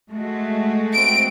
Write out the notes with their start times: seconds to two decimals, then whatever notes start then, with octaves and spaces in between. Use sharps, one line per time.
0.10 G#3 A3 F#4
0.93 C4 D7